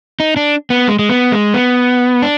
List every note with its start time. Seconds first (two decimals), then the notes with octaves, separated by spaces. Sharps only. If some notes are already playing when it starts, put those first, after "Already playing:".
0.20 D#4
0.37 D4
0.70 B3
0.88 G#3
0.99 G#3
1.09 B3
1.32 G#3
1.54 B3
2.22 D4